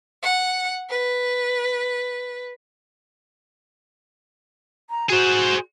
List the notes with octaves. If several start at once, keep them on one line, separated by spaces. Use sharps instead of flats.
F#5
B4
A#5
F#4 G#4 C5